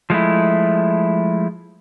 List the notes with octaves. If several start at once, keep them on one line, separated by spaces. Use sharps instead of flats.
F3 G#3 A3 E4